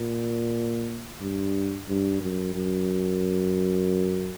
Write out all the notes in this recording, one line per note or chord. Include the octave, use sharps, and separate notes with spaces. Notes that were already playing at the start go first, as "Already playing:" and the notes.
Already playing: A#2
G2
G2
F#2
F#2